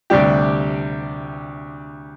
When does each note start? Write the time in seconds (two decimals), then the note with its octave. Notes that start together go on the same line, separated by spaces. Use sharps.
0.10 D2 C3 G3 D4 G4